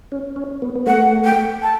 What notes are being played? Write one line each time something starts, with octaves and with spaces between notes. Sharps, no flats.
C#4
C#4
B3
B3
A3 F#5
G5
A5